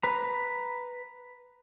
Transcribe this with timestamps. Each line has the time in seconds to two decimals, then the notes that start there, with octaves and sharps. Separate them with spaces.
0.03 B4 A#5